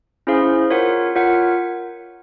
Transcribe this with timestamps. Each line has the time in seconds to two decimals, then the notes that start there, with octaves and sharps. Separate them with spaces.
0.27 C#4 E4 G#4 C5 F5
0.70 F4 A#4 C#5 F#5
1.15 F4 A#4 C#5 F#5